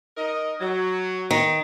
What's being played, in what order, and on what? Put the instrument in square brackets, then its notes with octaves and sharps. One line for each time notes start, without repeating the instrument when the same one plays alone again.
[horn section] D#4 A#4 D#5
F#3
[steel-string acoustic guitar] D#3